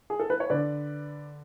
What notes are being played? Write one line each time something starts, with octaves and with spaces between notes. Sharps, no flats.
G#4
A4
B4
C#5
D3 B4 D5